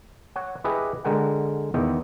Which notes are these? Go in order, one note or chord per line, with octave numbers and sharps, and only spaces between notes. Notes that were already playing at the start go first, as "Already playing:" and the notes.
C#5 F#5
E4 G4 G#4 B4 D#5
D3 G#3 A#4 F#5 G5
E2 D#3 B3 E4 G5